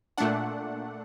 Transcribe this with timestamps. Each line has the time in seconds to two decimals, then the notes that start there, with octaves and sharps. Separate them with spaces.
0.18 A#2 A3 D4 F#5